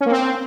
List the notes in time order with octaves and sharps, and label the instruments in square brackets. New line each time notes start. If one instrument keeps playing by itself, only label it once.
[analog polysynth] C#4
A#3
C4